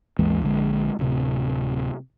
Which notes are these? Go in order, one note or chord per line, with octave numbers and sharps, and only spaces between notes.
G#1 D#2 E3 G#3
A#1 D3 G#3
D1 C3